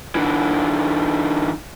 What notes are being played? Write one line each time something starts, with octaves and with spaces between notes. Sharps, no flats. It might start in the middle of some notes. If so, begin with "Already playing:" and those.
D3 E3